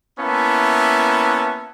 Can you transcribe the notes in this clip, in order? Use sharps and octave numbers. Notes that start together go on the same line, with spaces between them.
A#3 B3 C#4 E4 E5 A5